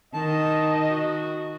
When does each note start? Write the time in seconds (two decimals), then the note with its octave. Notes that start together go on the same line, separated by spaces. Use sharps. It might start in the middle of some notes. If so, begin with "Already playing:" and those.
0.14 D#3 D#5 A5
0.91 F#4